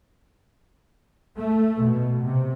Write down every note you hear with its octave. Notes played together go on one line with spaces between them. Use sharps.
A3
B2
C3